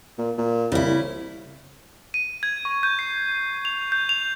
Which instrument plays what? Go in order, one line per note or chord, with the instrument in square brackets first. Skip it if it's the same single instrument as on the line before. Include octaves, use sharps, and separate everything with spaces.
[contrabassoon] A#2
A#2
[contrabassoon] C2 [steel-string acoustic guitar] C#3 E4
[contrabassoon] C2
[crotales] D#7
G#6
C#6
G6
C7
F7
G6
F7